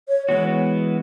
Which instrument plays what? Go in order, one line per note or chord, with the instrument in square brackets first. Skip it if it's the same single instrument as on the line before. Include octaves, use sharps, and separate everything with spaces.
[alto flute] C#5
[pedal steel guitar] E3 G#3 B3 F#4 [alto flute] C#5